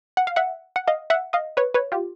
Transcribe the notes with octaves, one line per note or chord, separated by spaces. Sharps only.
F#5
F5
E5 F#5
F#5
D#5 F5
E5 F#5
D#5 F5
B4 C#5
B4 C#5
F4 G4